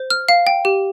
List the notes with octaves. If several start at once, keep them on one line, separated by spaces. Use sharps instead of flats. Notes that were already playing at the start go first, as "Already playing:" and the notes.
Already playing: C5
F6
F5
G5
G4